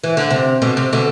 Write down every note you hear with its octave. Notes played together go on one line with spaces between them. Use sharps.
E3
D3
C3
B2 D3
C3
B2 D3